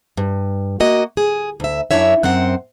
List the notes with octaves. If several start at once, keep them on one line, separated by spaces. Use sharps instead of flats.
G2
A#3 F#4 D#5
G#4
D2 E5
F#2 E3 D4 E4 C#5 E5
F#2 C4 C5 F#5